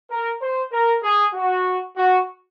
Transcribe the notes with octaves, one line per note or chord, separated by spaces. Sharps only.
A#4
C5
A#4
G#4
F#4
F#4